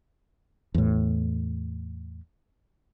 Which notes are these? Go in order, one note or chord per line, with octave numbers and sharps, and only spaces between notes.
E2 A2